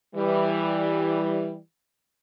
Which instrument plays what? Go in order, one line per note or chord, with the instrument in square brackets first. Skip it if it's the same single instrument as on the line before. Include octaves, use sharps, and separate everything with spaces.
[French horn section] E3 G3